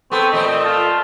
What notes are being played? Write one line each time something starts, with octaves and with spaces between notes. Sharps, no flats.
B3 C4 A4 C#6
A#2 A3 C4 D#5
F4 A5